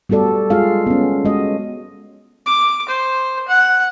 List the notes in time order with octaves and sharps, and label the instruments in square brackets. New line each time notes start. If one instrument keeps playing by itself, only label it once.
[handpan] G3 B3 F#4 A4 D5
G#3 F4 G#4 F5
B3 C#4
G#3 F#4 D#5
[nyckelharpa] D6
C5
F#5